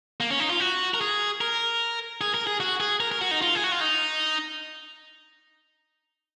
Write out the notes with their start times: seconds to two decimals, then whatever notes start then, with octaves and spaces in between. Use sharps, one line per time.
0.20 A#3
0.31 C#4
0.40 D#4
0.50 F4
0.60 F#4
0.94 A#4
1.01 G#4
1.41 A#4
2.21 G#4
2.34 A#4
2.47 G#4
2.60 F#4
2.80 G#4
3.00 A#4
3.12 A#4
3.21 F#4
3.31 D#4
3.42 F4
3.55 G#4
3.64 F#4
3.72 F4
3.81 D#4